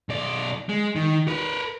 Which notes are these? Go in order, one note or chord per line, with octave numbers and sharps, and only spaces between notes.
B1 D5
G#3
D#3
A#4 B4